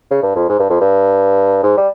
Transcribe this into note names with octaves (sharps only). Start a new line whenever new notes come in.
C#3
G2
F2
G#2
G2
F2
G2
G#2
G3